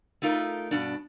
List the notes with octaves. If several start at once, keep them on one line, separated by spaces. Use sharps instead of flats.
A3 D#4 F4 A#4
G2 B2 D4